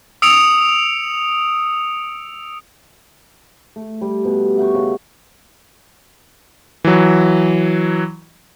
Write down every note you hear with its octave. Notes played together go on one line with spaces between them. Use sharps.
D#6 E6 C#7 D7 F7
A3
G3
B2
E5 F#5 G5 C#6
C#3
E3 F#3